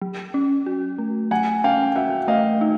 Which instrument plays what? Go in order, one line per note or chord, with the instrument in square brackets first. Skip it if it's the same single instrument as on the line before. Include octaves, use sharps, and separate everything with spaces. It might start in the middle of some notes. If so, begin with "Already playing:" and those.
[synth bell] F#3
C#4
F#4
A3
[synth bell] F#3 [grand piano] F#5 G#5
[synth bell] C#4 [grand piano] F5 G5
[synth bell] F#4 [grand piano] E5 F#5
[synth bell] A3 [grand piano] D#5 F5
[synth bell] D#4